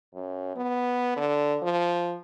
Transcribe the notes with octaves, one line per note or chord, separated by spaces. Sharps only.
F#2
B3
D3
F3